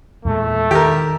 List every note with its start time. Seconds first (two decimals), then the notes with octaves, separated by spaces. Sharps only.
0.25 E2 A#2 G#3 A3
0.71 D#3 G4 A#4